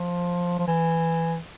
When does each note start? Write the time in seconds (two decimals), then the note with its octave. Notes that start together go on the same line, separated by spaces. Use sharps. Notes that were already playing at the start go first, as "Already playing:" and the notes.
Already playing: F3
0.59 F3
0.68 E3